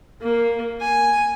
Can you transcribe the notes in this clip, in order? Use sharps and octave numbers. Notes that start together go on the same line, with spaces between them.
A#3
G#5